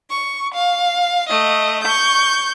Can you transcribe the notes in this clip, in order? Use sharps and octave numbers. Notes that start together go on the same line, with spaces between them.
C#6
F5
A3 D#5
C#6 G6